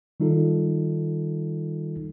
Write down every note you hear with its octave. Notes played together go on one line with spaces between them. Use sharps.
D#3 G3 D#4 F4 A4